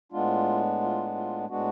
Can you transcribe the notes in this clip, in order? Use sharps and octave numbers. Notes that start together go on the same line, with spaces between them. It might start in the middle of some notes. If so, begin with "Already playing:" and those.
A2 G#3 B3 D4 F4
F4
F4
A2 G#3 B3 D4 F#4